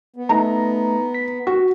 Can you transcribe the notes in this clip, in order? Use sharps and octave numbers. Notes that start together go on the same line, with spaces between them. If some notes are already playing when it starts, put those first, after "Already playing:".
B3
A3 D#4 A#5
B6
F#4